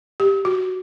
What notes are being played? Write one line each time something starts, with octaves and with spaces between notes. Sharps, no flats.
G4
F#4